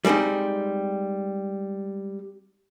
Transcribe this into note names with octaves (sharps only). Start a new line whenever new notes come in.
G3 G#3 A#3 C4 D#4